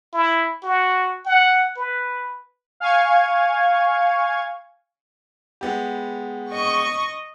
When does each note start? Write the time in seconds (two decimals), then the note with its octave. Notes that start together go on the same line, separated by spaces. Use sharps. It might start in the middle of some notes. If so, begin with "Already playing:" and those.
0.13 E4
0.63 F#4
1.26 F#5
1.77 B4
2.80 F5 G#5 C#6 G#6
5.61 G#3 B3 G4
6.52 D#5 C#6